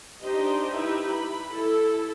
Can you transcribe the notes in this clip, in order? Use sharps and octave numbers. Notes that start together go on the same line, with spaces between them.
D4 D#4 G4 C5 D#5
D#4 E4 G4 B4 E5
B5
E4 A4